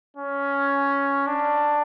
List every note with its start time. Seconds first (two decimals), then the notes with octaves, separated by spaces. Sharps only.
0.17 C#4
1.27 D4